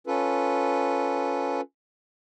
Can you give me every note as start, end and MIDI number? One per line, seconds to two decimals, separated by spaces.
0.07 1.61 61
0.07 1.61 65
0.07 1.61 69
0.07 1.61 71